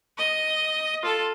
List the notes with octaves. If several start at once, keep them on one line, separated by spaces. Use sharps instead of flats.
D#5
F4 A4